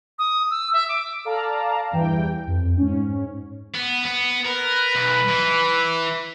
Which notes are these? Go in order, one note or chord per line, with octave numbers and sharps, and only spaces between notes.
D#6
E6
E5
D6
A4 D5 F5 A5 A#5
E2 G2 E3 G5
F2
G#2 C#4
B3
B3
A#4 B4
B1
E3